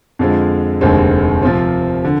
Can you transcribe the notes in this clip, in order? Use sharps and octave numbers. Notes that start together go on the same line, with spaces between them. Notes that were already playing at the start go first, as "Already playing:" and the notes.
F2 D3 F3 G#3
F1 D#2 D3 G#3 C4
C3 F3 C4 F4
D3